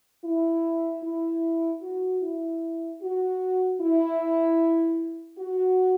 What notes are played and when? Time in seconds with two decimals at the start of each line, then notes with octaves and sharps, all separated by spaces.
0.25 E4
1.03 E4
1.82 F#4
2.22 E4
3.02 F#4
3.80 E4
5.39 F#4